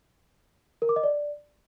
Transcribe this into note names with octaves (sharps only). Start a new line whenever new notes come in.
A#4
D6
D#5
D5